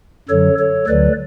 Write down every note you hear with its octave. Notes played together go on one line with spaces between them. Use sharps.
F#2 D3 F#3 A4 C#5
A4 C#5
D2 D3 F#3 B4 D5